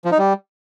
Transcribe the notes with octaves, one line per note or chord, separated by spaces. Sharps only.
F3
D#4
G3